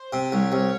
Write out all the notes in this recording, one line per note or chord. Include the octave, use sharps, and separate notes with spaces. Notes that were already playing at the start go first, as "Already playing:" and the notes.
Already playing: C5
C3
C2 C#5
C2